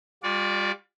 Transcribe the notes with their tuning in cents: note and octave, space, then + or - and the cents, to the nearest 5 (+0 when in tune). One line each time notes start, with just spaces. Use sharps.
G3 +35 F4 +45 D5 -15